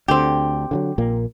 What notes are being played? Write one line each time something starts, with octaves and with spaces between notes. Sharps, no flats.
D2 D3 C4 G4
D3 F3 F#3
A#1 A#2 A#3